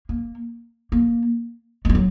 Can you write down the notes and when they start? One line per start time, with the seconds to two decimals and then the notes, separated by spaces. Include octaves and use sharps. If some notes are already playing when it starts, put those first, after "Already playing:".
0.09 A#3
0.92 A#3
1.85 A3
1.89 G#3
1.95 F#3